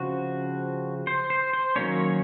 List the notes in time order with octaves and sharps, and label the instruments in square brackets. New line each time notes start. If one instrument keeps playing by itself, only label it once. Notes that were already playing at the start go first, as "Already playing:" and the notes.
Already playing: [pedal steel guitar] C#3 F3 C4 F#4
C5
C5
C5
D#3 F#3 A#3 C#4 C#5